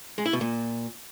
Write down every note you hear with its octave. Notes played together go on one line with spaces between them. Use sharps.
G#3
E4
B2
A#2